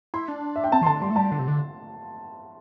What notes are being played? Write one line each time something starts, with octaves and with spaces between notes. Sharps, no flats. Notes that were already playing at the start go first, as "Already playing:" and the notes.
E4 C6
D4
E5
G5
C4 A5
E3 C6
D3 A5
G3 C6
A3
G3 A5
D3
C3
D3